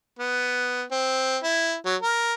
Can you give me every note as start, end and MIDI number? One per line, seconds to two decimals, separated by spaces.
0.19 0.83 59
0.91 1.37 60
1.44 1.74 64
1.85 1.95 54
2.02 2.33 70